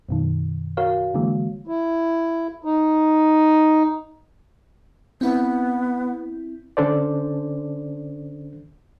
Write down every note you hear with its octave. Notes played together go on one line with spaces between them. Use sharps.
F#2 B2 D#3
F#4 A#4 C#5 F5
D3 E3 G#3 A#3
E4
D#4
B3 C4 E4
D3 C#4 D4 A4 C5 D5